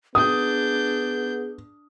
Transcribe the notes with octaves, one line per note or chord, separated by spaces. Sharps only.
B3 D4 G#4 D#6 G6